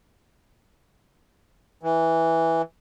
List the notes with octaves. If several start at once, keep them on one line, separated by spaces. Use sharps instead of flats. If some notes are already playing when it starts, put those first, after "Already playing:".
E3